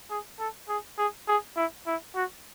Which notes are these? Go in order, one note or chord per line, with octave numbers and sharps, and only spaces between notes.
G#4
A4
G#4
G#4
G#4
E4
E4
F#4